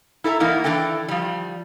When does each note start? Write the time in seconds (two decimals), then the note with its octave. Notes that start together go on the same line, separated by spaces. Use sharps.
0.24 E4 A4 E5 A5 A#5
0.40 E3 A#3 B3 D#4 E4
0.64 E3 D4 E4 A4 G5
1.08 F3 G3